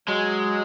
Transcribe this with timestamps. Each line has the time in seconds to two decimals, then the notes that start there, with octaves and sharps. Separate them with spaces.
0.07 F#3 G#3